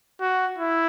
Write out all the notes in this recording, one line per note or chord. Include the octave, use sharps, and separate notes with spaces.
F#4
E4